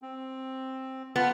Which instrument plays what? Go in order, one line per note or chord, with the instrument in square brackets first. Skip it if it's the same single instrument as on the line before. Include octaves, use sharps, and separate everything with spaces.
[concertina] C4
[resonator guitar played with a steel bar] B3 [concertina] F4 F#5